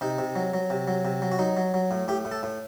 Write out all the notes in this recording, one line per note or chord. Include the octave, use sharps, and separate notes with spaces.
C3 D#4
C3
F#3
F#3
C3
F#3
C3
F#3
F#4
F#3 D#4
F#3
F#3
A2
A2 G4
A2
A4
A2